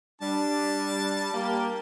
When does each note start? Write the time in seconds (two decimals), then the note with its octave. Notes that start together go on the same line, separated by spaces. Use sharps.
0.22 G3 D4 A5
1.34 A#3 G4